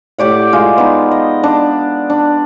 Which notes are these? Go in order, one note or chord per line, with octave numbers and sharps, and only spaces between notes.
A2 G4 D5 F#5
G#3 F4
B3 D#4
D#5
D4
D4